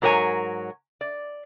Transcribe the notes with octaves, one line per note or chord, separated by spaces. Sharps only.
G#2 F#3 A#4 C#5 G#5
D5